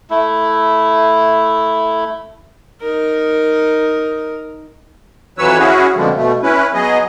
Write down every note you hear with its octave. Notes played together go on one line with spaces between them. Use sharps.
A3 E4
D#4 A#4
F2 E3 F#3 B4 C#5 E6
C#4 E4 F#4 G#4
F2 B2 D3 F3 G3 G#3
B2 A3
C#4 E4 B4
F#3 B3 G#4 D#5